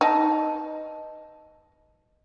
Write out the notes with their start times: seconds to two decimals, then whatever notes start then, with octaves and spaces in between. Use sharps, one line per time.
0.01 D#4 B4 D#5 A5